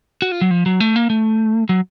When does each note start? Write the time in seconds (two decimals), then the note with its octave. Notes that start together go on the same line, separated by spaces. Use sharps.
0.22 F#4
0.32 F4
0.41 F#3
0.51 F3
0.66 F#3
0.80 A3
0.96 A#3
1.10 A3
1.69 F#3